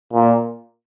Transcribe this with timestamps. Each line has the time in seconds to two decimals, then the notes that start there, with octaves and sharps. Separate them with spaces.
0.13 A#2